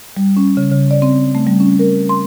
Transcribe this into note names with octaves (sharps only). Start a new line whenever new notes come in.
G3
C#4
C#3
C#3
D5
C4
A3
G3
C#4
A#4
C6